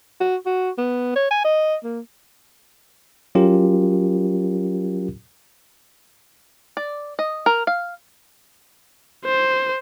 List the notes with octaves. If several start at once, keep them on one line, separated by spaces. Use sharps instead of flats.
F#4
F#4
B3
C#5
G#5
D#5
A#3
F#3 C#4 F4 G4 A#4
D5
D#5
A#4
F5
C5